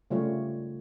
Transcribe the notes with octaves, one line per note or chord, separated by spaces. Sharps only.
C#3 G3 A3 F4 C#5